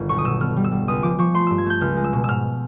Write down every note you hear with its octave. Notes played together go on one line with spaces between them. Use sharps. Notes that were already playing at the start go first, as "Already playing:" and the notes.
Already playing: G1 D#3
B1 C#6
D#6
B2 E6
B3 F6
G3
E6
G3
C#2 D#6
F3 D6
F3 C#6
A3 C6
G2 E6
G#6
A3 G6
C#2 F6
G#3
E6
B2
G#2 E6 F6